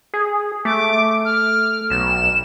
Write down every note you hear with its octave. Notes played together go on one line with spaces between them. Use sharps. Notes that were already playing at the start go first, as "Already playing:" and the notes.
G#4
A3 D6
F6
B1 E7